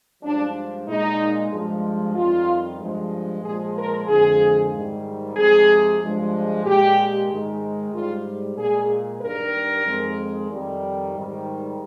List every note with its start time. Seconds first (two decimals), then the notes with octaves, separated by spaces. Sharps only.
0.22 G2 F3 G#3 D4
0.87 A#2 G#3 D#4
1.51 G2 F3 G#3
2.15 F2 D#3 G3 F4
2.79 G2 F3 G#3
3.43 A#2 F3 G#3 G#4
3.76 A#4
4.07 F2 D3 F3 G#3 G#4
4.72 G#2 D#3 G3
5.36 F2 C3 F3 G#3 G#4
6.01 G2 F3 G#3
6.64 A#2 G#3 G4
7.28 G#2 D#3 G#3
7.92 G#2 G3 F4
8.58 A#2 G#3 G#4
9.21 G2 D#3 G3 A#4
9.85 F2 D#3 G#3
10.50 F2 D#3 G3
11.14 G#2 D#3 G3